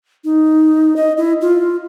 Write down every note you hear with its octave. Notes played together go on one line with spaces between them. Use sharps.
D#4
D#5
E4
F4